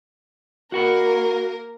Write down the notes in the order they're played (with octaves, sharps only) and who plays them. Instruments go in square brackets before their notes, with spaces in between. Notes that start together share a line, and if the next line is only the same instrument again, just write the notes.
[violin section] A#3 A#4 [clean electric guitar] F#4 F#5 B5